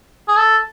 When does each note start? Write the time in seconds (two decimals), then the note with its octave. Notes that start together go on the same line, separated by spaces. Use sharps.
0.28 G#4
0.37 A4